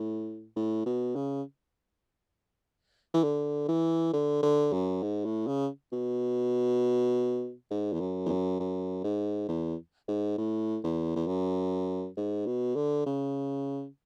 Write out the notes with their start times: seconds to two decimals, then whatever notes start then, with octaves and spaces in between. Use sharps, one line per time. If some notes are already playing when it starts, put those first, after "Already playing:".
Already playing: A2
0.56 A2
0.86 B2
1.16 C#3
3.14 E3
3.24 D3
3.68 E3
4.13 D3
4.43 D3
4.73 F#2
5.03 G#2
5.25 A2
5.47 C#3
5.92 B2
7.71 G#2
7.93 E2
8.00 F#2
8.26 E2
8.29 F#2
8.60 F#2
9.04 G#2
9.48 E2
10.08 G#2
10.38 A2
10.83 E2
11.16 E2
11.27 F#2
12.17 G#2
12.46 B2
12.76 D3
13.06 C#3